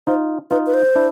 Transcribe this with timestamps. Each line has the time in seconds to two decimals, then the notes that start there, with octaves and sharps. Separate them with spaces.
0.07 D#4 F4 C5
0.51 D#4 F4 B4
0.67 B4
0.74 C5
0.95 D4 E4